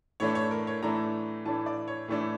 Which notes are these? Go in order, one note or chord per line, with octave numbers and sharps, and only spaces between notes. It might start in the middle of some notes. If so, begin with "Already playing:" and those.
A2 E3 A3 D4 C#5
C#5
A#4
C#5
A2 E3 A3 D4 A#5
A2 E3 A3 D4 A5
D5
C#5
A2 E3 A3 D4